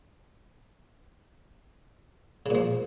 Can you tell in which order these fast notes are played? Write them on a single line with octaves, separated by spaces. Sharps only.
C#3 A#2 F3